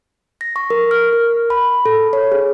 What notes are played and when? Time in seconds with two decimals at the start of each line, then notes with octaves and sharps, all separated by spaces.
0.41 A#6
0.56 C#6
0.70 A#4
0.91 F6
1.13 A#4
1.50 B5
1.85 A4
2.13 C#5
2.32 G#4